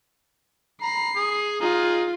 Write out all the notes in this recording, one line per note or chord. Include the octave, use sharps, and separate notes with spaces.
A#5 B5 C7
G#4 D#6
D#4 F4 G#4 A#5